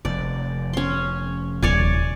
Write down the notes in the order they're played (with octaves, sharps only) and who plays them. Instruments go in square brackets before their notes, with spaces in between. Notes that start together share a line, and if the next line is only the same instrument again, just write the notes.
[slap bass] F1 [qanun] D5
[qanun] C#4 C6
[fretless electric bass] D#1 [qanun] C#5 D5 G#5